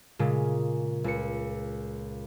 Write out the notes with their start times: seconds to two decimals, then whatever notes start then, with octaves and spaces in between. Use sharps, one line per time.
0.19 A#2 C#3 G#3
1.04 C#2 C#7